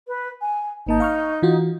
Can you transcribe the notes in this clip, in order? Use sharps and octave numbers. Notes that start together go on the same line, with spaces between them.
B4
G#5
G#1 A#3 D#4 A5
F5 C#6 F6
E3 F4 F#4